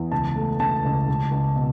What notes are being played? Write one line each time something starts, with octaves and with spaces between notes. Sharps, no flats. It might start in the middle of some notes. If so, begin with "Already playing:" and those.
Already playing: E2
C#2 A5
A3
C#3 A5
C#2
C#2
C#2
B2